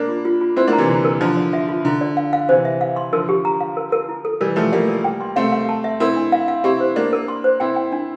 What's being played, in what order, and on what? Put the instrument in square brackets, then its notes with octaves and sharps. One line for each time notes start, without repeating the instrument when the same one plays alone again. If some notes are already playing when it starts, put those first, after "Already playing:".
Already playing: [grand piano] A#3 D4
[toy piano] F4
F4
F4
[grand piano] C4 E4 [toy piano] C5
[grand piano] A#3 D4
[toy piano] A#5
[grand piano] C3 E3
[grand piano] D3 [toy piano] E4
[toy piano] A#4
[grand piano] D3 F3 [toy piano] E4
[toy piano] D5
E5
F4
[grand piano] D3 [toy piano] E4
[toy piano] D5
F5
F5
[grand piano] C3 E3 [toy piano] C5
[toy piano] E5
F5
C6
[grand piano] D3 F3 [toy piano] A#4
[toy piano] G4
A#5
F5
A#4
A#4
E4
A4
[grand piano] E3 G3 [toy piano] A#4
[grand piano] F3 A3 [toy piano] A#4
[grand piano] G3 A#3 [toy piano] D5
[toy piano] A#4
G5
C6
[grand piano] A3 C4 [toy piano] F5
[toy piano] F5
A5
E5
[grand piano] C4 E4 [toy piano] A#4
[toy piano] D4
F5
F5
[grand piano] C4 E4 [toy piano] G4
[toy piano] C5
[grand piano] A#3 D4 [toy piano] D5
[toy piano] A#4
C6
C5
[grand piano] C4 E4 [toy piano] G5
[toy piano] G5
D4